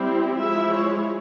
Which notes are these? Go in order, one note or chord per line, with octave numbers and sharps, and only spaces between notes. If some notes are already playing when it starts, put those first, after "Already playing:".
Already playing: G3 C4 E4 G4
F3 G#3 E4 E5
C#5